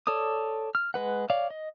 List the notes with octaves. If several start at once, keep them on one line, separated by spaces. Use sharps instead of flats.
A4 C#5 D5 D#6
F6
G#3 B4 F#5
C#5 D5 F5
D#5